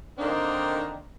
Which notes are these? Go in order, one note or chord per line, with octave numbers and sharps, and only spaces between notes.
D3 D#3 A#3 C4 D4 D#4